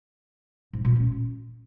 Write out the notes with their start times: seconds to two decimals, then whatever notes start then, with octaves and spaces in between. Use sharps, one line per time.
0.73 G#2
0.85 A#2
0.96 C#4